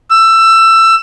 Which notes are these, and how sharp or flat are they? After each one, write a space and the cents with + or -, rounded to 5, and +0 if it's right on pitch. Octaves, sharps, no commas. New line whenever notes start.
E6 +20